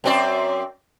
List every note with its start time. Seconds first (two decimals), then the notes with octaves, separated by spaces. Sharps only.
0.04 F#2 C4 D5